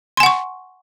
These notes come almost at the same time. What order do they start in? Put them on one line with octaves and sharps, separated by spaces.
C6 G#5 F#5 C#6